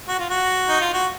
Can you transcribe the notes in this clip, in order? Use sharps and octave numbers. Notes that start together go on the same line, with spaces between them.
F#4
F4
F#4
D#4
F4
F#4